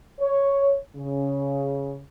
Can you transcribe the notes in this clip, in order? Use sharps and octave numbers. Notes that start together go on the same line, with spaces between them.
C#5
C#3